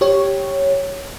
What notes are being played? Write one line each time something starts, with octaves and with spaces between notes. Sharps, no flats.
G4 C#5